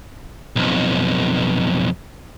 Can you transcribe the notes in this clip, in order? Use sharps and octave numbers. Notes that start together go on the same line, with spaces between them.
B1 F2